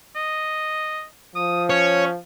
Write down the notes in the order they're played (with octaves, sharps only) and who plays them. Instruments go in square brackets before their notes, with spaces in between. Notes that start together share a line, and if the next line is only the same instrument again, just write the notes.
[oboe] D#5
[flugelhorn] F3 [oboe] D#6
[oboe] C#4 [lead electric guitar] C#5